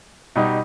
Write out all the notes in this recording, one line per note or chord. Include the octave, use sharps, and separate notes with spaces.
B2 G3 D#4